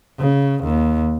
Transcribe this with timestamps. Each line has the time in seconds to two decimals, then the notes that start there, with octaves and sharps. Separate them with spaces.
0.18 C#3
0.63 D#2